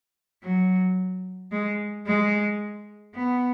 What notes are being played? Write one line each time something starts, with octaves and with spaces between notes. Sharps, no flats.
F#3
G#3
G#3
B3